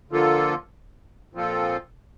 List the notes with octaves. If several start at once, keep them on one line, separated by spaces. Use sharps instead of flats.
D3 F3 A#3 F4 A4
A#2 F3 C4 F4 A4